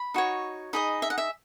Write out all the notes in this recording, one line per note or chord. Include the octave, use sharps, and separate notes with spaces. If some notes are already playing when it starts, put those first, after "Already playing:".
Already playing: B5
D#4 F#4 C#5
D#4 G#4 D#5 B5
E5
F#5
E5